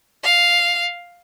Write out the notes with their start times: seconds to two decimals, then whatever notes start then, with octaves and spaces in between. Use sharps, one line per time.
0.24 F5